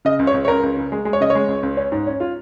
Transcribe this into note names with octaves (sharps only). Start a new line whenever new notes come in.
C#3 D#5
C#2
C#5
C#2
C#5
C#2 A#4
C#2
C#3
G#3
G#3
C#5
C#3 D#5
C#5
G#3
C#2
C#2
C#4
G#2
C#4
F4